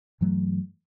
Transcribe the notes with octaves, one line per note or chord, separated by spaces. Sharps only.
G2 E3 F#3 A3